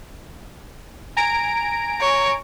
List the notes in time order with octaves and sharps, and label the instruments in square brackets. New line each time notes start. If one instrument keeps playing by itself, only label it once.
[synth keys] G#5 A#5 D7
[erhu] C#5